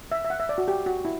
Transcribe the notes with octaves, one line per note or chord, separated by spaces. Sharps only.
E5
E5
F#5
E5
D5
F#4
G4
F#4
E4